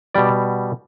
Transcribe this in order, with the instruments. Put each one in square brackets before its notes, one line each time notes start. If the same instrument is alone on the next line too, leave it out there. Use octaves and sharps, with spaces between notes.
[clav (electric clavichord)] B2 G3 D5